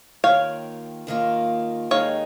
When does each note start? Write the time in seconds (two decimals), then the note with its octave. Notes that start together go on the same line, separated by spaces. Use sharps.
0.24 D#2 D#3 A#3 F4 C#5 F5
1.07 D#2 D#3 A#3 F4
1.91 D#2 D#3 G#3 D#4 C#5 F5